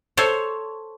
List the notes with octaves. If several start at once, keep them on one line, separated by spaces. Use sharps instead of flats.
A4 C5 C#5